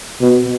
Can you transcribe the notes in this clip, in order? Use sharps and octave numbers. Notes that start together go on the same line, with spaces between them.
B2